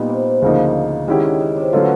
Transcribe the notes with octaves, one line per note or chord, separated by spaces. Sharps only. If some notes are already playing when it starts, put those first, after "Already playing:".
Already playing: A#2 G3 B3 D#4
C3
C3
D2 C#3 F3 A#3 D#4
D3 D#3 G#3 C#4 E4 G4
C#3
C#3
C3
B2 D3 F#3 A3 C#4 F4